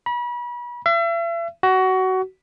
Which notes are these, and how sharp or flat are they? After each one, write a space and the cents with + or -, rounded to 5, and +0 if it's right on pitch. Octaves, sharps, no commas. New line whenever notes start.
B5 -35
E5 +40
F#4 +20